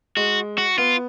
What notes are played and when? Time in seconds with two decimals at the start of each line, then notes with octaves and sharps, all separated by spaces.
0.16 G#3 F#4
0.58 F#4
0.78 B3 F4